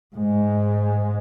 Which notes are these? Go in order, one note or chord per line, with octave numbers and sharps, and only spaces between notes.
G#2 G#3